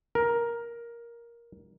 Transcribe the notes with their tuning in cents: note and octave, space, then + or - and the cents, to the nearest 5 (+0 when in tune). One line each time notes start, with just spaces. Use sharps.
A#4 +10